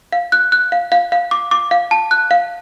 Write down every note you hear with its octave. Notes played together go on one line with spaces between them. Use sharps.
F5
F#6
F#6
F5
F5
F5
D6
D6
F5
A5
F#6
F5